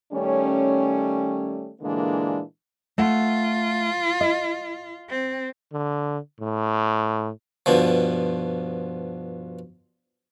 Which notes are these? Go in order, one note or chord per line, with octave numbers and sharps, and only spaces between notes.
D#3 G3 A3 C#4
A#2 D3 E3 G#3 A#3 D4
A3 F4 F#5
D#5
C4
D3
A2
G2 B2 F3